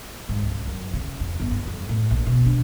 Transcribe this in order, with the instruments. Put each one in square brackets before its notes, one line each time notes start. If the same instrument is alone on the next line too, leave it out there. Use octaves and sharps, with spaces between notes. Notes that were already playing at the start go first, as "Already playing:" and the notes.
[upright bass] G#2
C#2
F#2
C#3
F2
G1
G2
F2
A2
A#1
B2
D4